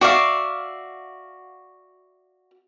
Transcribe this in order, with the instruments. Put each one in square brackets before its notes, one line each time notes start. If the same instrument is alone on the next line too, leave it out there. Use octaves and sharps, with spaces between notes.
[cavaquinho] F#4 D5 E5 F5